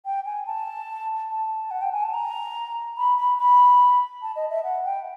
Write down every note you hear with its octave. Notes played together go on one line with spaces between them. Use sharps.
G5
G#5
A5
A5
F#5
G5
G#5
A5
A#5
B5
B5
B5
A5
D#5
E5
F#5
G5